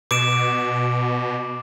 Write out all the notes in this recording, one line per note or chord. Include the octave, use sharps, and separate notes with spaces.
B2 D6 D7 E7